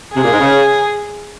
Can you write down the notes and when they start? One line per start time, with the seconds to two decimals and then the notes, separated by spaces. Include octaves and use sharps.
0.16 C3 G#4
0.24 A#2
0.33 G#2
0.41 C#3